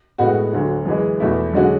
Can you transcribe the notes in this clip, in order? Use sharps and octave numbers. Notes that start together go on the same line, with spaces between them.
A2 G#3 B3 F#4
D2 D3 F#3
F#2 E3 G#3
E2 B2 A3 E4
F#2 D3 G#3 C#4 F#4